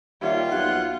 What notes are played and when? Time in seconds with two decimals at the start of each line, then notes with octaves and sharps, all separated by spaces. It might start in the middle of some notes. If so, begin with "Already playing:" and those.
0.22 D#2 G3 F4 C#5 E5 F#5
0.52 B1 E4 F#5